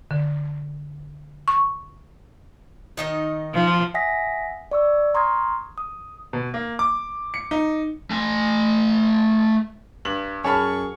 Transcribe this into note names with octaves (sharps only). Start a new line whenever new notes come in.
D3
C#6
D#3 D#4 D#5
F3
E5 F#5 G#5 D#6 A#6 B6
D5 C#6 E6
A#5 C6 C#6 D#6 F6 G#6
D#6
B2
A#3
D6
C#7
D#4
A3 G#5
G2 F#7
F#2 G#4 C#5 A5 B5 C#6 F6